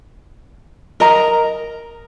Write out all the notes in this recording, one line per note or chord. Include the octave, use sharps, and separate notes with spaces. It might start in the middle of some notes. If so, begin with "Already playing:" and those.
A#4 D#5 A#5